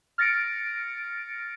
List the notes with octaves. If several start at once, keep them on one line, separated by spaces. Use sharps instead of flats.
F6 A6 A#6 C#7 D7